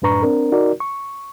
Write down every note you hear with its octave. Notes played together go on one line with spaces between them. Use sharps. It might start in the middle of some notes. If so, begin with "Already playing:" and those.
F#2 A2 D4 B4 A#5 C#6
C4 D4 A#4
D#4 F#4 A#4 D5
C#6